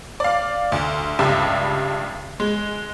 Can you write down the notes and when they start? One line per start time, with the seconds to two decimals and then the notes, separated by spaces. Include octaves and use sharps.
0.20 D5 F5
0.72 D2
1.19 C#2 G2 G3 E5
2.40 G#3